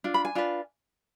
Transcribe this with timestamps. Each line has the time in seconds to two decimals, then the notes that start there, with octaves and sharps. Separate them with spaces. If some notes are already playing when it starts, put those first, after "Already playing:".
0.04 D4 F4
0.14 B5
0.25 G#5
0.35 D4 F4 B4